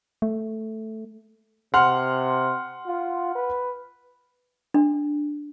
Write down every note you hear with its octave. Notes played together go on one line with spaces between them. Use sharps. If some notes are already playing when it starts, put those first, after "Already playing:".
A3
C3 F#5 C6 F6
F4
B4
D4